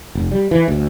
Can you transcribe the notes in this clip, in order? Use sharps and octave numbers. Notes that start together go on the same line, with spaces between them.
F1
G3
E3
D2